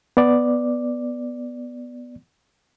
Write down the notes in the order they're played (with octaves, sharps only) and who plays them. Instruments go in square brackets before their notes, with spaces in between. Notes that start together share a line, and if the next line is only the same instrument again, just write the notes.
[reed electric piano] B3 D5